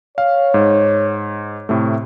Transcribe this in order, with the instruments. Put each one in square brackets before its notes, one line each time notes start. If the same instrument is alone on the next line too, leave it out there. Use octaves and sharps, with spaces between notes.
[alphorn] C#5 [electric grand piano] F5
[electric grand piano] G#2
A2 C3 A3